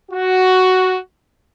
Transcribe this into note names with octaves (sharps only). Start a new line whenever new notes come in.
F#4